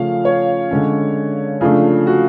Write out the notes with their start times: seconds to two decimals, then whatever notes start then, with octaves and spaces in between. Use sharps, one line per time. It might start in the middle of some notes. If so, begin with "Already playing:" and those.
Already playing: C#3 F3 A3 C#4 F5
0.25 C#5
0.71 D3 G#3 C#4
1.61 C#3 F3 A3 D4
2.07 F#4